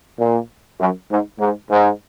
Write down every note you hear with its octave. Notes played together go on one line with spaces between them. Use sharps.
A#2
F#2
G#2
G#2
G#2